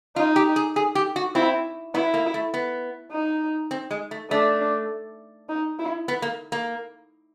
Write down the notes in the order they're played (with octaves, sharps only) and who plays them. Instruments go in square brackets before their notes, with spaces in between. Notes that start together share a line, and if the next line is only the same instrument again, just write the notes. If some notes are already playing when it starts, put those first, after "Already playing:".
[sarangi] D#4 [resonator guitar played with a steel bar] F4
[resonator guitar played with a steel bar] G4
G#4
G#4
G4
F#4
[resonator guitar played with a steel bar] C4 [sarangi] E4
[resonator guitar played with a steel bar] B3 [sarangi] E4
[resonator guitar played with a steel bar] A#3
A3
B3
[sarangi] D#4
[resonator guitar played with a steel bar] C4
G#3
A3
[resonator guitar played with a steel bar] A3 [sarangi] D4
[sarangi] D#4
E4
[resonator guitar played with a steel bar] B3
A#3
A#3